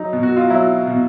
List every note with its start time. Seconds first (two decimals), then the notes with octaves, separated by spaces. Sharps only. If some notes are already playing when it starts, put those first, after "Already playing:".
Already playing: F#3 D#4
0.13 B2
0.23 F#4
0.36 F4
0.50 F#3 E4
0.87 B2